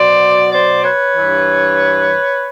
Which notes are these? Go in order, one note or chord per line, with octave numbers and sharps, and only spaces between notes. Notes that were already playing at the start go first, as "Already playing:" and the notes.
Already playing: B2 F#3 C5 D5
C5 D5
B4 C#5
G2 E3